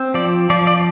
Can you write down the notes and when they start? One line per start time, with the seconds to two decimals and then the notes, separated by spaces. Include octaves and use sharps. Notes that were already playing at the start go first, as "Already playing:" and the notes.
Already playing: C4
0.14 F3 D5
0.50 F3 D5
0.67 D5